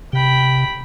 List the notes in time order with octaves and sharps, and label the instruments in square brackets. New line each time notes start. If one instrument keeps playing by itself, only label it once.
[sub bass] C3 [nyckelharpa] G5 B5